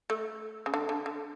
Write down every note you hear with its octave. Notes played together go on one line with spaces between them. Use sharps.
A3
C#3
D3
D3
D3